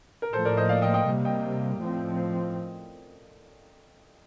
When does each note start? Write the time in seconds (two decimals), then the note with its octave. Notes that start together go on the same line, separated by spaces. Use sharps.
0.22 A#4
0.33 A2 F3 A#3 A4 C5
0.45 A#4 D5
0.57 C5 D#5
0.69 D5 F5
0.82 D#5 G5
0.94 D#5 G5
1.07 C3 G3 A#3
1.25 D#5 G5
1.79 A2 F3 C4